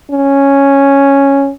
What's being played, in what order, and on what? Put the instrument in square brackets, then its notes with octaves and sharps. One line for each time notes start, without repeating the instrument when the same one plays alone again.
[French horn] C#4